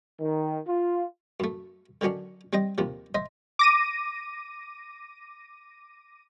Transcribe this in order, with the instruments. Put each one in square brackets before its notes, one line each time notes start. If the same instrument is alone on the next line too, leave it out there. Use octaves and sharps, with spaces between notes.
[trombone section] D#3
F4
[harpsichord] F#2 A3
D3 D#3 F#3 C#4 D4
G3 C4 D#5 G5
D#2 C3 F3
C5 D#5 E5
[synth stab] D6 A#6 D#7